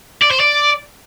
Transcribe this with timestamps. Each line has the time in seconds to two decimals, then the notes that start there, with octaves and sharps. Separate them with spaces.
0.22 D5
0.31 C5
0.40 D5